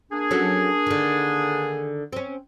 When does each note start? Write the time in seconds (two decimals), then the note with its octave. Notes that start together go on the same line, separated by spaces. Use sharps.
0.12 A#3 D4 G#4
0.31 F#3 C#4 A4
0.86 D3 D#3
2.13 C4 C#4